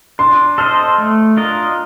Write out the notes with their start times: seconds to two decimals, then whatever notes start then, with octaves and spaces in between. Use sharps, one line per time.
0.19 D4 C6
0.58 A4 C5 D#5 F6
0.98 A3
1.37 D4 F4 A#4 D#5